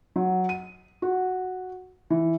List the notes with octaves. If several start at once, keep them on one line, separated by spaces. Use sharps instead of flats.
F#3
D#7
F#4
E3